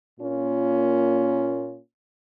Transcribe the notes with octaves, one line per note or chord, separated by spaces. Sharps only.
A#2 A#3 C#4 F4